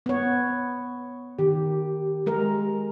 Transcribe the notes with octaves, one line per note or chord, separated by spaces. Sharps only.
B3 C#5
D#3 G4
G#3 A#4